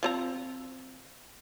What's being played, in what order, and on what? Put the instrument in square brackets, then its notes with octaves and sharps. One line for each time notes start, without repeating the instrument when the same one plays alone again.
[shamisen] F3 C4 A#5